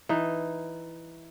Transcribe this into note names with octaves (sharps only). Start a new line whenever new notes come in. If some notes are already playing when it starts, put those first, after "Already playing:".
E3 D#4